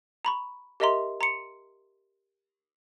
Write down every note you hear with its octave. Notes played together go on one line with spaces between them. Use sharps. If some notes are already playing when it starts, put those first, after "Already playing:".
A#5 B5 C#6
G4 A#4 D#5 E5 A#5 C6
A#5 C6 C#7